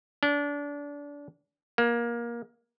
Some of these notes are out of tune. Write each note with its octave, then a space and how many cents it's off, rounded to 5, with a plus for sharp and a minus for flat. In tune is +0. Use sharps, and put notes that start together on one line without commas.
D4 -25
A#3 +20